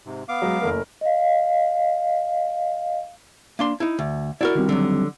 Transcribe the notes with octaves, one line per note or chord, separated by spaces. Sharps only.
G#2 C3
B3 F5 D6
F#3 G#3
F#1 A3 A#4
D#5 F5
A#3 D4 C6
D#4 E4
D2
E4 F#4 A#4 D5
D#3 G3 C4
D3 F#3